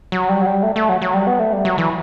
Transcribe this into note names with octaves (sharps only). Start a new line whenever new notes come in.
F#3
G3
F#3
G3
A3
A3
F#3
F#3
G3
B3
A3
G3
F#3
E3